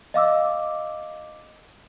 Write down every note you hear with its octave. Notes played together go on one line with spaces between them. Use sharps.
D#5 F5 D6 E6